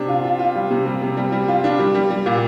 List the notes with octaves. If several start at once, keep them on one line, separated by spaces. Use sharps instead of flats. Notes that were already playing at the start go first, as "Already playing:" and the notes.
Already playing: C3 D4
F4
F4
F4
G3
C3
G3
C3
G3
G3
F4
D4
G3
G3
G3
A#2